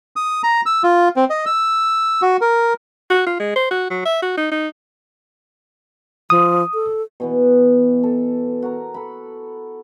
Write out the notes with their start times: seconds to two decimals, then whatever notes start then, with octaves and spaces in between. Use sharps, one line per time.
0.16 D#6
0.43 A#5
0.66 E6
0.83 F4
1.16 C4
1.30 D#5
1.46 E6
2.22 F#4
2.41 A#4
3.10 F#4
3.27 F4
3.40 G#3
3.56 C5
3.71 F#4
3.91 F#3
4.06 E5
4.22 F#4
4.38 D#4
4.52 D#4
6.30 F3 D#6
6.74 A4
7.20 B2 E3 B3
8.03 A4
8.62 F#4 A#4 A#5
8.94 A4 B5